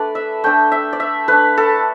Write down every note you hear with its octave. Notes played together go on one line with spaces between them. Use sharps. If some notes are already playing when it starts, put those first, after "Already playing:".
Already playing: A3 D4 A4 B4 D5
E5
A3 D4 G5
E5
D5
E5
A3 D4 B4
A4